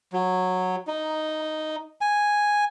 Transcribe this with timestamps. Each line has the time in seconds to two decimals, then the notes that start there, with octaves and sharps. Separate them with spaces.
0.13 F#3
0.87 D#4
2.01 G#5